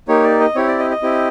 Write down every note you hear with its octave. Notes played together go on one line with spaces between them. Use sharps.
A#3 D#4 G4 C#5
D5
D#5
C4 E4 G4 C#5
D5
D#5
D#5
C4 E4 G4